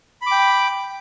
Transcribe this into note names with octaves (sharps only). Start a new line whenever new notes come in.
G5 B5 D6